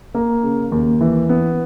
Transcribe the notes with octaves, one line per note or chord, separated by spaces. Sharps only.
A#3
C#3
D#2
E3
B3